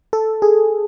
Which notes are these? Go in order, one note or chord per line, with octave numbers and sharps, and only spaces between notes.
A4
G#4